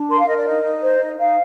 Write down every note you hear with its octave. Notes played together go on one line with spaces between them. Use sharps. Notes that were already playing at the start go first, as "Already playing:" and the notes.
Already playing: D4
A#4 C6
F5
A#4 D#5
D5
D#4 D#5
D#4
C5
D#4
D#4 F5